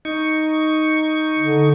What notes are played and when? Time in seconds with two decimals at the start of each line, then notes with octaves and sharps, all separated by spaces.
0.05 D#4 C#6
1.38 D3